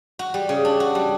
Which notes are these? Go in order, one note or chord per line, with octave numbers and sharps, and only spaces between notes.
F#4
G3
C#3
D4
F#4
G3